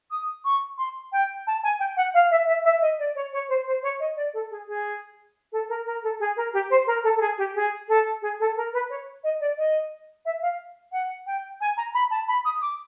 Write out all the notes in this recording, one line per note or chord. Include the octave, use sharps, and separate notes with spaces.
D#6
C#6
C6
G5
A5
G#5
G5
F#5
F5
E5
E5
E5
D#5
D5
C#5
C#5
C5
C5
C#5
D#5
D5
A4
G#4
G#4
A4
A#4
A#4
A4
G#4
A#4
G4
C5
A#4
A4
A4
G#4
G4
G#4
A4
G#4
A4
A#4
B4
C#5
D#5
D5
D#5
E5
F5
F#5
G5
G#5
A#5
B5
A5
B5
D#6
D6